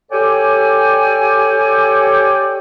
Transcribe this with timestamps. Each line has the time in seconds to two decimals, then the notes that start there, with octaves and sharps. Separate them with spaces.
0.12 G4 A4 C#5 D5 G5 G#5